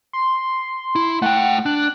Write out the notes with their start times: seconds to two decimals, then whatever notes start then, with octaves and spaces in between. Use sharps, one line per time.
0.13 C6
0.96 E4
1.22 A3 F#5 G5
1.66 D4 F#6